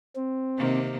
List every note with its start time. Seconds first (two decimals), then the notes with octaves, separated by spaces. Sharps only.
0.16 C4
0.57 C3 D#3 A#3